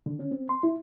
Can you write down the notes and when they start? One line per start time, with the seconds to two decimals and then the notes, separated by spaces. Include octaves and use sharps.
0.06 D3
0.19 C#4
0.31 C4
0.49 C6
0.63 E4